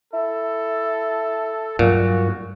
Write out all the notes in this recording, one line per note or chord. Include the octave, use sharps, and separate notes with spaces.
E4 A4
G2 A#2 F#3 F#4